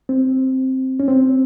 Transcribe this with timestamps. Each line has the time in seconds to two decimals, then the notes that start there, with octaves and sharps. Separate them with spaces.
0.09 C4
1.00 C#4
1.08 C4